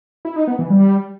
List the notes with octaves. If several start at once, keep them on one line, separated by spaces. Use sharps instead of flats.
E4
D#4
B3
E3
G3